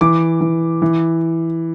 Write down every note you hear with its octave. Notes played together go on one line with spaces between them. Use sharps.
E3 D6
E3
E3